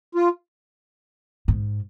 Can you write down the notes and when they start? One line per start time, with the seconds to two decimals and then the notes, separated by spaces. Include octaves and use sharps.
0.15 F4
1.48 G#2